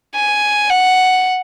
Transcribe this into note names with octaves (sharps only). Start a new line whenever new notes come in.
G#5
F#5